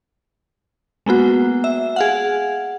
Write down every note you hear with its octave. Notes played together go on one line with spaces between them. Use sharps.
G#3 A#3 B3 F#4
E5
G#4 F5 F#5